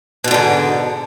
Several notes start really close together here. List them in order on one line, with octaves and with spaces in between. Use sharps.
B2 F2 D3 G#2